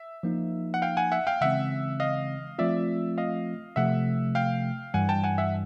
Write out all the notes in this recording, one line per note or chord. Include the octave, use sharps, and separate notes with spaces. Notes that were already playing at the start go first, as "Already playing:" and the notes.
Already playing: E5
F3 A#3 D#4
F#5
F5 G5
F#5 G#5
E5 F#5
F5 G5
C#3 E3 G#3 C4 E5 F#5
D#5 F5
F3 A3 C4 F4 D5 E5
D#5 F5
C3 F3 A3 E5 F#5
F5 G5
G2 E3 G3 F#5 G#5
G5 A5
F#5 G#5
E5 F#5